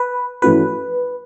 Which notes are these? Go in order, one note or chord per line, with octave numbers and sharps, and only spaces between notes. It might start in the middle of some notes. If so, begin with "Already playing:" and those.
Already playing: B4
E3 A3 C#4 F#4 B4